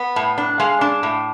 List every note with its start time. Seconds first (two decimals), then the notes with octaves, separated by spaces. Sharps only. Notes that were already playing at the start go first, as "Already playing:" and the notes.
Already playing: B3
0.16 A2
0.38 D4
0.60 G#3 F5
0.81 D4
1.03 A2